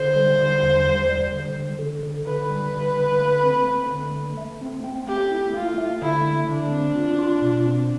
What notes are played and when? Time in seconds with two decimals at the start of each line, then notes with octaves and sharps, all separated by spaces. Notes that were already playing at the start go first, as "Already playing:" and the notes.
Already playing: D3 C5
0.16 G3
0.39 D3
0.63 E2
0.86 G3
1.09 G3
1.32 D3
1.56 D3
1.79 D3
2.03 D3
2.27 D3 B4
2.50 G3
2.73 D3
2.97 D3
3.20 A3
3.43 C4
3.67 A3
3.91 D3
4.14 A3
4.37 A3
4.61 C4
4.84 C4
5.08 A3 G4
5.31 E4
5.54 A3 F4
5.78 A3
6.01 D3 E4
6.25 A3
6.49 D3 D4
6.72 C4
6.96 F4
7.19 F4
7.42 B2
7.65 C4